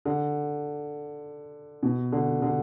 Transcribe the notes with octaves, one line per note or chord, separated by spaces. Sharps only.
D3
B2
D3
D3